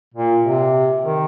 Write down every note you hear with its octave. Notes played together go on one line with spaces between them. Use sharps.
A#2
C3
D#3